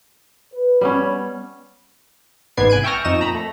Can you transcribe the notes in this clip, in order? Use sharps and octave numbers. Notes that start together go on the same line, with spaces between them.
B4
G3 B3 C#4 C#5
A1 G#2 B3 D5 G#6 C7
C2 G#5 F#6 D7 D#7
E5 G5 A5 C#6 F6 A#6
F2 D#4 C#6 D#6 E7
A#2 A#5 B5
A3